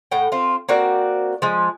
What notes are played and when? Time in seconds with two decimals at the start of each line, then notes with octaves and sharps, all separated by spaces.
0.11 A2 F#5 G5
0.32 C4 F4
0.69 A#3 C4 F#4 D5
1.42 F3 G#3